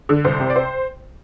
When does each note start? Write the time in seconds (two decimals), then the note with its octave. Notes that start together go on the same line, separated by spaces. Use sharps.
0.09 D3
0.25 C2 C5
0.40 C3
0.50 D5
0.56 C5